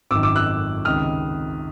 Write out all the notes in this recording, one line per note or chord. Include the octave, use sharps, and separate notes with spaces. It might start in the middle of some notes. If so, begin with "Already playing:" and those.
G#1 F#2 D#3 D6 E6
D6 E6
E6 F#6
C#2 C3 D#3 D#6 F6